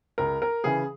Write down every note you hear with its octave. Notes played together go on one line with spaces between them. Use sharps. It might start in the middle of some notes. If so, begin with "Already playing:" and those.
C#2 A#4
A#4
C#3 E3 G#4